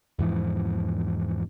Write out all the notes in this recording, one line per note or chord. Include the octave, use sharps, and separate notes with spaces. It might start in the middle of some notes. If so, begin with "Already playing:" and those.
E2 G#2 E3 F3